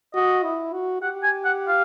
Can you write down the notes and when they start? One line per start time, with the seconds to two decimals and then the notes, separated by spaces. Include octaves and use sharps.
0.14 F#4 D#5
0.43 E4
0.73 F#4
1.02 G4 F#5
1.23 G#5
1.45 F#5
1.68 F5